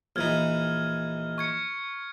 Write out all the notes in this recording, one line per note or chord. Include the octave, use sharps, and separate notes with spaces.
A#1 E3 D#4 F6 G#6
C#6 G#6 C#7